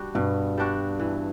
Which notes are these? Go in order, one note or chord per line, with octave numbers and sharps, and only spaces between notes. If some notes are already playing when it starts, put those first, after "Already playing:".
Already playing: G3 D4 F#4
G2 B2
G3 D4 F#4
E3